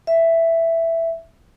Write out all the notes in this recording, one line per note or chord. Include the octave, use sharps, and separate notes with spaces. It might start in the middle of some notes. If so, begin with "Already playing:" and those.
E5